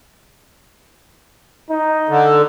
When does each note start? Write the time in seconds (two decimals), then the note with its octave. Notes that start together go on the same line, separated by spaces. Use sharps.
1.70 D#4
2.09 D3